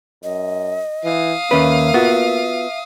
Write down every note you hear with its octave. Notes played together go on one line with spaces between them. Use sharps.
F#2 D#5
E3 F5 D#6
D#2 A#3 C#4 B4 E5
B3 F4 F#4